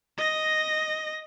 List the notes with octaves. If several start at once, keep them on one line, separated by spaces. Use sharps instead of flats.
D#5 A#6